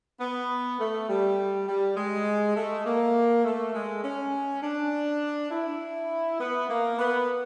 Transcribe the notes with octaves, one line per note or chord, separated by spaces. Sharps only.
B3
A3
G3
G3
G#3
A3
A#3
A3
G#3
C#4
D4
E4
B3
A#3
B3